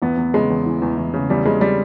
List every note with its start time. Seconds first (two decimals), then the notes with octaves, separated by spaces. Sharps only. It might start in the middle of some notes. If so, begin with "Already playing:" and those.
0.02 E2 B3
0.17 E2
0.34 C#3 G#3
0.50 E2
0.66 E3
0.82 E2
0.98 E2
1.14 C#3
1.30 E2 G3
1.46 C#3 G#3
1.61 G3